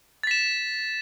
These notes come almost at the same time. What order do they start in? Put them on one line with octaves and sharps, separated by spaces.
A6 B6 E7